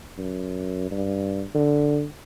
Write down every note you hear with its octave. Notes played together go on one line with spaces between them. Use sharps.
F#2
G2
D3